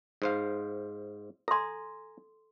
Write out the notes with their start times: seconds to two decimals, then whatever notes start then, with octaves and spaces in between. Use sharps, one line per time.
0.22 G#2 C5 F5
1.48 A4 G#5 A#5 C6